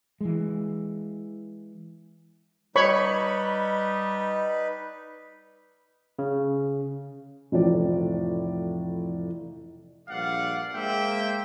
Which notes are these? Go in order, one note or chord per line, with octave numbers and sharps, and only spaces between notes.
E3 G#3
G3 D#4 B4 C#5 B5 C#6
C#3
F1 A2 E3 F3 D5
A#1 G2 D5 F5 F#5
G#3 A#3 C5 E5 G5